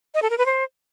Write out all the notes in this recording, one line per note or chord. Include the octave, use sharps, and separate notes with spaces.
D#5
A4
A#4
B4
C5